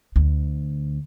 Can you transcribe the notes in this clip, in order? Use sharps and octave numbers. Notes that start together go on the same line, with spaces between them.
D2